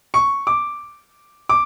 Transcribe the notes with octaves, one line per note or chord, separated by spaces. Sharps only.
C#6
D6
D6